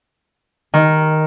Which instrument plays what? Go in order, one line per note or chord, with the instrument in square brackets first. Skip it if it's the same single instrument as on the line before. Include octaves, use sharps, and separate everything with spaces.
[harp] D#3